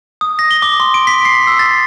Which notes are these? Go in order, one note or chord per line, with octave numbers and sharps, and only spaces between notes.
D#6
A#6
G7
D6
C6
D7
B6
C7
E6
A6